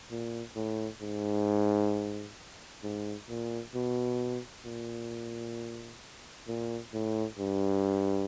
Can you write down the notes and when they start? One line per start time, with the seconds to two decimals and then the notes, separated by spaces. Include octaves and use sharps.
0.11 A#2
0.56 A2
1.02 G#2
2.84 G#2
3.29 A#2
3.75 B2
4.66 A#2
6.48 A#2
6.94 A2
7.39 G2